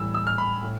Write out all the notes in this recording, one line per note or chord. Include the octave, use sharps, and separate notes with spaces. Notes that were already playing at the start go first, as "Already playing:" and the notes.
Already playing: A2 E3 G3 E6
E6
F6
B5
A2